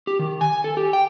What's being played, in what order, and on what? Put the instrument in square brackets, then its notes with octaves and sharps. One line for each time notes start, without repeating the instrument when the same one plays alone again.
[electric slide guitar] G4
D#3
G#5
A4
G4
G5